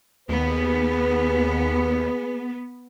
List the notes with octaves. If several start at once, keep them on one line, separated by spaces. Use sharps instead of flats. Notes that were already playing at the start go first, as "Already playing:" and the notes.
D#2 B3 G#4 B4